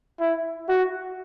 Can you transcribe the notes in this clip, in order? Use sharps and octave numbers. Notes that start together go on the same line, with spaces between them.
E4
F#4